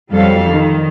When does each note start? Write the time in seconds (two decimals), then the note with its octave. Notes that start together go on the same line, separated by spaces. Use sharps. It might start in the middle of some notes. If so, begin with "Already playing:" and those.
0.14 F2 F#3 G3 A4 F5
0.50 D#3